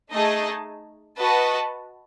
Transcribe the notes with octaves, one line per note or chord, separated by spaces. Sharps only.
A3 D#4 G#4 D#5 A5
F#4 B4 D#5 A5